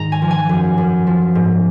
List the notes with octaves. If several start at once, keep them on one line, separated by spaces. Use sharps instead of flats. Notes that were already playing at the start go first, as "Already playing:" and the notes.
Already playing: G#2 D#3 A#5
G#5
F3
G#5
F#2
F#2
F3
G#2